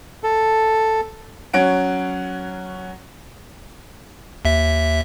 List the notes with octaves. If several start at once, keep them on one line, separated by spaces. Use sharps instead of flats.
A4
F#3 C#4 F#5 D7
D#2 E5